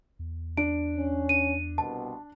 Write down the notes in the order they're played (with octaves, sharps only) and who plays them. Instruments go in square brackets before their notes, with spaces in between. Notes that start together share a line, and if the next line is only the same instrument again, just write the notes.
[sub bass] E2
[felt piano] D4 [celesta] D7
[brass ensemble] C#4
[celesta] D#7
[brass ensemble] C2 B2 [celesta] A5